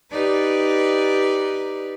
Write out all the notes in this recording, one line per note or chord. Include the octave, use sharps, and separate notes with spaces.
D#4 G4 B4 D5